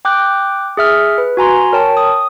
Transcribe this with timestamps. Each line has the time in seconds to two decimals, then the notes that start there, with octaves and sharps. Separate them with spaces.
0.05 G5 D6 F#6 G6
0.77 G#4 E5 F6
1.18 B4
1.37 F#4 G#5 A#5 C6
1.73 A#4 C#5 G5 A5
1.97 D#6